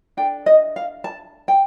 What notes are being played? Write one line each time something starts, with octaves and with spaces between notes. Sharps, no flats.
D4 A4 G5
D#5
F5
A5
G5